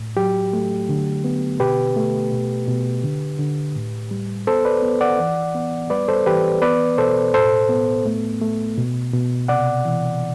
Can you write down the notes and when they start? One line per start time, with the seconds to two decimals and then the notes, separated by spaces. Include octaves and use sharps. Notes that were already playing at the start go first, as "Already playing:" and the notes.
Already playing: A2
0.16 F#3 G4
0.53 A3
0.89 D3
1.24 B3
1.60 B2 G4 B4
1.96 A3
2.32 B2
2.67 B2
3.04 D3
3.39 D3
3.76 A2
4.11 G3
4.47 B3 A4 C5
4.65 B4 D5
4.82 B3
5.01 D5 F#5
5.19 E3
5.55 B3
5.90 G3 B4 D5
6.08 A4 C5
6.26 E3 G4 B4
6.62 B3 B4 D5
6.98 B2 A4 C5
7.34 A2 A4 C5
7.69 B3
8.06 A3
8.42 A3
8.77 B2
9.13 B2
9.48 C3 D5 F#5
9.85 E3